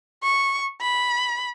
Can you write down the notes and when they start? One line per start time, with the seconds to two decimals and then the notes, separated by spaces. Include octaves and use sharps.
0.23 C#6
0.81 B5